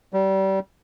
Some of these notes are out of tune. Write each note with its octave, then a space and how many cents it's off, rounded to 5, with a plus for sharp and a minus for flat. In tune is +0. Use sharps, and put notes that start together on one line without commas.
G3 -30